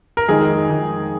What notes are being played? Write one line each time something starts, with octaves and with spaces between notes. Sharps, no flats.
A#4
F2 D#3 G#3 D#4 G#4
F2 D#3 G#3 D#4